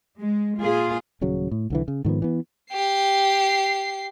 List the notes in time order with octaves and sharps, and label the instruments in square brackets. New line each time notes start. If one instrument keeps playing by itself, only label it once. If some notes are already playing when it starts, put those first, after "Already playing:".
[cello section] G#3
A#2 F4 G#4
[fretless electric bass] D#1 C#3 F#3
A2
C2 D3 E3
C#3
G#2 D#3 F3 B3
E3 B3
[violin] G4 C7